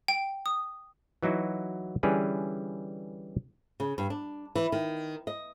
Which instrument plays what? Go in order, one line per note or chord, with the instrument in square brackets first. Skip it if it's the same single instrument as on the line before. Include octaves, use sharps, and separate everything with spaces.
[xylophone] G5
D#6
[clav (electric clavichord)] E3 F#3 D#4 E4 F#4
D3 E3 G3 C#4 G#4 B4
[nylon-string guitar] C#3
G2
D4
E3
D#3
D#5